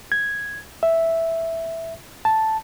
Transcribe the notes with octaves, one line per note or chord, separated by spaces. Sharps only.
G#6
E5
A5